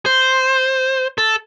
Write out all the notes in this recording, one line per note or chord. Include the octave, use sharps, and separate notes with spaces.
C5
A4